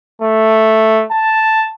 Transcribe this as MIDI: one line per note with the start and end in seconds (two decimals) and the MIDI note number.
0.22 1.04 57
1.12 1.70 81